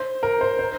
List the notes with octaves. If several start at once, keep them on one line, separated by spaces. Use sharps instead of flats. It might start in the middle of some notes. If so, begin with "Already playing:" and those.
Already playing: C5
A#4
C5
C5